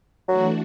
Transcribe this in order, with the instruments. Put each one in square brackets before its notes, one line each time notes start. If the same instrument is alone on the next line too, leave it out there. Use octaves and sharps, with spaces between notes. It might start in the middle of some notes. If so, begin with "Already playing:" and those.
[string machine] E3 A3 D4 F#4 [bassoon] F#3